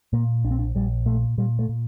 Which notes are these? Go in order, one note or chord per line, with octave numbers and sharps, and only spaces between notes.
A#2 A#3
A#1 D4
C4
D4
A#1 G3
A#2 A3
A#2 G3
A3
A#2